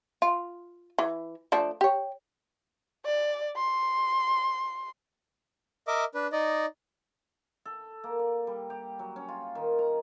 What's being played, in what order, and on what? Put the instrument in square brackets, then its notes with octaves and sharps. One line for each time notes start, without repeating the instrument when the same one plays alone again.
[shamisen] F4
E3
F3 A3 D4
G4 C#5
[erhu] D5
C6
[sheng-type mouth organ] A#4 D#5 E5 D6
D4 B4
D#4 D5 D#5
[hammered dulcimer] A4
A#3
D5
G3
G4
F#3
C#4
F4
D#3
A#5